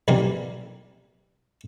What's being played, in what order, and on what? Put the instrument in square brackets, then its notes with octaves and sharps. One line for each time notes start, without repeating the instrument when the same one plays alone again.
[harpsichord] B1 C3 E3 G3 A#3